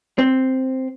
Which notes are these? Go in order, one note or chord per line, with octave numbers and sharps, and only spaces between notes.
C4